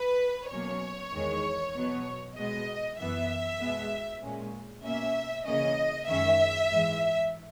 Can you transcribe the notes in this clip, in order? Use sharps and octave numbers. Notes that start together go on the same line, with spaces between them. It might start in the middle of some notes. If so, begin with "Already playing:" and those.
Already playing: B4
B2 F#3 A#3 C#4 C#5
E2 D#3 G#3
B2 F#3 B3
B2 G#3 B3 D#5
F#2 E3 B3 E5
B2 G#3 B3
A#2 G#3 C#4
B2 A#3 C#4 E5
C#3 E3 A#3 C#4 D#5
F#2 D#3 G#3 C#4 E5
G#2 E3 G#3